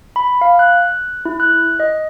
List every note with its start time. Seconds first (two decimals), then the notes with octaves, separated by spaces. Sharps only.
0.16 B5
0.41 F5
0.59 F#6
1.25 E4
1.40 F#6
1.80 D#5